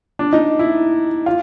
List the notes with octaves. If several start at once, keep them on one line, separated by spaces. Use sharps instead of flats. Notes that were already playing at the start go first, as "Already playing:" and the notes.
D4
D#4
E4
F4